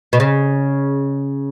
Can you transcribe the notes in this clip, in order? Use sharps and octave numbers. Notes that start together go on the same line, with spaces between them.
B2
C#3